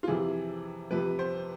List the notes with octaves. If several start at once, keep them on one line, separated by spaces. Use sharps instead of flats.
F4
F2 C3 E3 G#4
F2 C3 F3 B4
C5